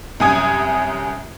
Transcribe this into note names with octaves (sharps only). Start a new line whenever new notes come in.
C2 F#2 G#5 D#6 G#6